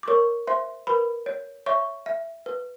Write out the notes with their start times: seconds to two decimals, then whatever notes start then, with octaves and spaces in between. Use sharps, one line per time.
0.03 D6
0.08 A#4 C#5 C#6
0.47 C5 E5 C6
0.87 A#4 B4 B5
1.26 C#5
1.66 C#5 E5 C#6
2.06 E5
2.46 B4